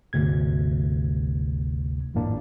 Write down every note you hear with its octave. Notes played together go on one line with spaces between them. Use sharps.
G1 D2 C3 G#6
G#1 F2 A2 A#3 D4